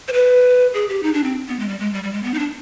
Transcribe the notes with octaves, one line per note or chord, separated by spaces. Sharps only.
C5
B4
G#4
G4
D#4
D4
C4
B3
G#3
G3
G#3
G3
G3
G#3
B3
D#4
D4